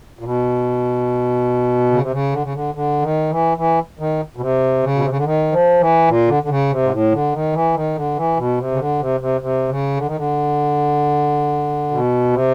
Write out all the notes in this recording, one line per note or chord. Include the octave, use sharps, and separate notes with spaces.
A#2
B2
C#3
C3
C#3
D3
C#3
D3
D3
D#3
E3
E3
D#3
B2
C3
C#3
B2
C3
C#3
D3
D#3
F3
E3
A#2
D3
D3
C#3
C3
G#2
A2
D3
D#3
E3
D#3
D3
E3
B2
C3
C#3
D3
C3
C3
C3
C#3
D3
D#3
D3
B2
C3